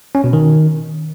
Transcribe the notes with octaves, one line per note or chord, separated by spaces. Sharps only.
C#4
B2
D#3